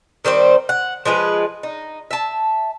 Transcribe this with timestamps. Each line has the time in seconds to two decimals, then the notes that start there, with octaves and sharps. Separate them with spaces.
0.25 D#3 G3 C4 C5
0.69 F#5
1.05 F3 G#3 G#4 B4
1.63 D#4
2.11 E5 A5